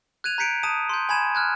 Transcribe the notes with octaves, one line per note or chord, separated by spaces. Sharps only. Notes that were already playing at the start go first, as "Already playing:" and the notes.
F#6 G#6 D#7 F7
A#5 G6 B6 C#7 D7
A5 D#6 D#7
C6 G6
G#5 B5 G#6 E7
F6 F#6 G#6